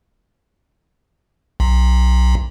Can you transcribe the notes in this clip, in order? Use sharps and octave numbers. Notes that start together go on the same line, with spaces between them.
B1